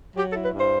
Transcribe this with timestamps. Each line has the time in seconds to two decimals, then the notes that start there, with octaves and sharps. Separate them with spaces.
0.16 F#3 G4
0.30 A4
0.35 E4
0.44 B4
0.53 G2 C5